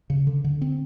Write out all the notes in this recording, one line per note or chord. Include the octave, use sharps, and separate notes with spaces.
C#3
D3
D3
C4